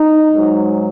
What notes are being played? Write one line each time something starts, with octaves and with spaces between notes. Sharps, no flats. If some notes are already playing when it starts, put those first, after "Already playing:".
Already playing: D#4
G#2 F#3